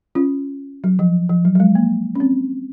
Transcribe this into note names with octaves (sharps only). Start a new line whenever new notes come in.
C#4 F4
F#3
F3
F3
F#3
F#3
G#3
A#3
C#4
C4